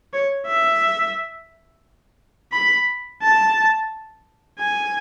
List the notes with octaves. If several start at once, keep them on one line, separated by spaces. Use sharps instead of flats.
C#5
E5
B5
A5
G#5